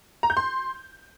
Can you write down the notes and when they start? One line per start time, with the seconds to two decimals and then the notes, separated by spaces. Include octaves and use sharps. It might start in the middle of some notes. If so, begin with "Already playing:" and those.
0.23 A#5
0.30 G6
0.37 C6